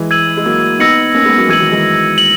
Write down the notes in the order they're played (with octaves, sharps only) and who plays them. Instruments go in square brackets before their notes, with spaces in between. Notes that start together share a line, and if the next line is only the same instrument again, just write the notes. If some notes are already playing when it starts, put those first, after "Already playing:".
Already playing: [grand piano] E3 G#3
[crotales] E6 G#6 D#7 F#7
[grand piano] G#3
F#3 A#3
[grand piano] B3 D#4 [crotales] E6 A#6 C#7 F#7
[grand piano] A#3 C#4
G#3 B3
F#3 A#3
[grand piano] E3 G#3 [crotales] E6 G#6 D#7 F#7
[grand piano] D#3 F#3
E3 G#3
[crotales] D#7 F#7